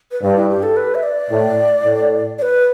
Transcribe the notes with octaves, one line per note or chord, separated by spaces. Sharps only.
B4
G2 D5
E4
G4
A4
B4
E5
D5
A2
A2
D5
B4